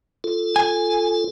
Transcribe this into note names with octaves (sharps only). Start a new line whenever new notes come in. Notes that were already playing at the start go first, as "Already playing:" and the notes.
F4 A4
G#5